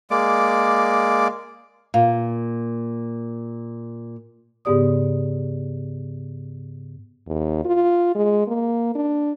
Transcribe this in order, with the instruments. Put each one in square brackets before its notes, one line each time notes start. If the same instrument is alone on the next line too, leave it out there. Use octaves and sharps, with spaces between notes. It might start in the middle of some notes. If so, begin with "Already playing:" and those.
[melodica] G#3 A#3 D5 D6
[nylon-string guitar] A#2 [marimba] F5
[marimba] G#2 C#3 B3 G4 D5 D#6
[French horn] D#2
F4
G#3
A#3
D4